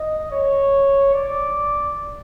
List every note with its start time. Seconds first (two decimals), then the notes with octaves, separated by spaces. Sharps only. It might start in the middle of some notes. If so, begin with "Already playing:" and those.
Already playing: D#5
0.31 C#5
1.14 D5